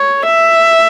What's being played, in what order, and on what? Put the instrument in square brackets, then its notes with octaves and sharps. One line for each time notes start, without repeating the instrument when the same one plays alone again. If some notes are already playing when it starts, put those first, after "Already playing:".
Already playing: [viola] C#5
E5